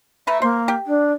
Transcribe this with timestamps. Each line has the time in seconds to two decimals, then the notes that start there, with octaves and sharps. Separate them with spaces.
0.27 A3 B4 E5 A#5
0.42 A#3 C5
0.68 G4
0.86 D4